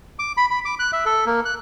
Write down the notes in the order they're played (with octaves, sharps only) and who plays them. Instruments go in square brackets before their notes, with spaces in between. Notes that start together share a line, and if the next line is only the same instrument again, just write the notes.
[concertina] D6
B5
B5
D6
F#6
E5
A4
A#3
F#6